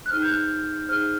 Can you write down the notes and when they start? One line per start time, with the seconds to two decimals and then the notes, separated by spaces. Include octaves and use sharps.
0.06 F#6
0.10 D#4 G#4 C5 F6
0.22 G6
0.30 F#6
0.89 D#4 G#4 C5 F6